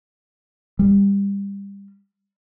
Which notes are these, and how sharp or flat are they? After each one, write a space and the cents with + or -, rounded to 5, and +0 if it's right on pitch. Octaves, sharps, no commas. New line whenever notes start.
G3 +25